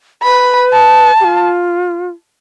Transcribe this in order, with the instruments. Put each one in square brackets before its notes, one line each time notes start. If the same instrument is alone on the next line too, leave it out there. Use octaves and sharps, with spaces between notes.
[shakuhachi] B4 [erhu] B5
[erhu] A5
[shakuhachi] G4
F4